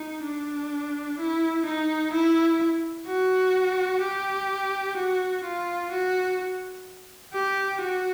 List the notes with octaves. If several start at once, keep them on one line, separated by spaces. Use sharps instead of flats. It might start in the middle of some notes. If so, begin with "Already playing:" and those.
Already playing: D#4
D4
E4
D#4
E4
F#4
G4
F#4
F4
F#4
G4
F#4